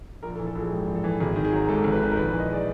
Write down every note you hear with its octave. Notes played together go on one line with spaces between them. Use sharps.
A#1 A#4
A4
E3
A4
A#1 G#4
G#2 G4
A#1
A4
E3
G#1 G#4
D#3
G#4
F#3
G#2 A4
G#1
B4
D#3
A#4
A#1 B4
E3
D#5
G#3 D5